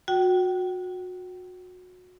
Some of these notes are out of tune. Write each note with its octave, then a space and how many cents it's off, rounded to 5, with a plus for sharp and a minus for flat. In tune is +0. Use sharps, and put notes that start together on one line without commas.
F#4 -25 G5 -30